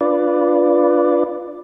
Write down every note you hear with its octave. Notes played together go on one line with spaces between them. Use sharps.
D4 F4 B4 D5